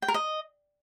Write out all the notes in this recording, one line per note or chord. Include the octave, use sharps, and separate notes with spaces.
G5
A#4
D#5